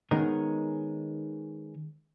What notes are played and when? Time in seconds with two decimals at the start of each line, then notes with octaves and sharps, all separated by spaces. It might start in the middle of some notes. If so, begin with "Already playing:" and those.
0.11 D#3 G#3 B3 C#4 D#4 A#4